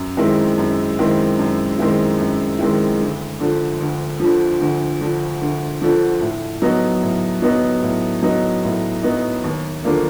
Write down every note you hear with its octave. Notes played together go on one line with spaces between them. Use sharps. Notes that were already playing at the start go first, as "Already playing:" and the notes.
Already playing: F#2
D#3 G#3 C4 E4
F#2
D#3 G#3 C4 E4
F#2
D#3 G#3 C4 E4
F#2
D#3 G#3 C4 E4
D2
D3 F3
D2
D3 F3
D2
D3 F3
D2
D3 F3
A2
F#3 B3 D#4
A2
F#3 B3 D#4
A2
F#3 B3 D#4
A2
F#3 B3 D#4
D#2
D3 F3 A#3 D4